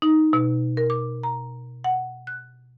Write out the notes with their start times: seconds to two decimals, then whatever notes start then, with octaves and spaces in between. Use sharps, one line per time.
0.02 D#4
0.33 B2
0.77 A#4
0.90 D6
1.23 A#5
1.84 F#5
2.27 F#6